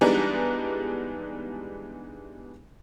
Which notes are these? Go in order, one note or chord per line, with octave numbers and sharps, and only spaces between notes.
E3 G3 G#3 B3 D4 D#4